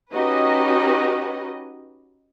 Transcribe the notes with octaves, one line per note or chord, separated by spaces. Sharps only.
C#4 D#4 F#4 G4 B4 D#5